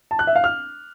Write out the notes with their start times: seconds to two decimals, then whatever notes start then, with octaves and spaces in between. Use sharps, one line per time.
0.11 A5
0.19 F#6
0.27 E5
0.36 F5
0.44 F6